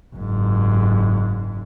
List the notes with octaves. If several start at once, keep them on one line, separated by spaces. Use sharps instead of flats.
F#1 G#2